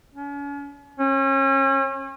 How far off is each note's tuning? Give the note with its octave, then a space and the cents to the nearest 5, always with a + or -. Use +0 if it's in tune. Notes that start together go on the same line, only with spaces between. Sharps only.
C#4 +40
C#4 -35